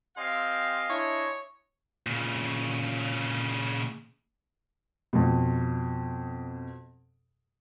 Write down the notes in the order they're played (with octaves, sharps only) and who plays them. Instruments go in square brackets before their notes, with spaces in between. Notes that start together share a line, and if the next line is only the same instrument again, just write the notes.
[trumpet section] C4 G4 F5 [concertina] D#5 G#5 C6
[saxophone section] D4 E4 [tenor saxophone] C#5
[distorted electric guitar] A#2 C#3
[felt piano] F2 B2